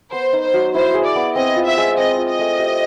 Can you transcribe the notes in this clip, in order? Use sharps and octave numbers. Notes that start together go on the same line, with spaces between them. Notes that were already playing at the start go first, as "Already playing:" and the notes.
B3 C5
D#4
C5
F#3
E4 C5
G#4
D5
B3
C4 D#5
F4
E5
G#3
C4 D#5
F4
D#5
A3
G4